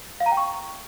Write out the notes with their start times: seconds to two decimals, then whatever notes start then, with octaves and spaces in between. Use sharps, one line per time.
0.20 F5
0.26 A#5
0.32 G5
0.37 C#6